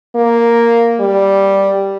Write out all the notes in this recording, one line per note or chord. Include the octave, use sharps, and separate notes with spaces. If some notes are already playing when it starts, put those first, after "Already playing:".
A#3
G3